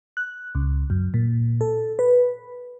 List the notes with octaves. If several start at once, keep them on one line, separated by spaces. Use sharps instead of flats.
F#6
C#2
F#2
A#2
A4
B4